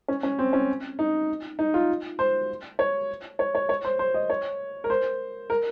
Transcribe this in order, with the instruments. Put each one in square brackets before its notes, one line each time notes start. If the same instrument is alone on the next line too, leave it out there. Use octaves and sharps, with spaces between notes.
[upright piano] C#4
C#4
C4
C#4
D#4
D#4
F4
C5
C#5
C#5
C#5
C#5
C5
C5
D#5
C#5
A#4
C5
A#4